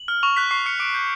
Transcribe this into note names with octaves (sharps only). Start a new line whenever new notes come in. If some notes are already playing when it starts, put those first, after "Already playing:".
Already playing: F#7
F6
C#6 F7
F#6 B6
C#6 C7
F6 C#7
D6 D7
G6